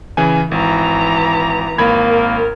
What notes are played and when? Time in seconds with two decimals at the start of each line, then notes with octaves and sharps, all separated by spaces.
0.17 C#3 E3 G#5
0.51 G#1 E3 A#5
1.78 G#1 A#3 B5 G#6
2.09 A#4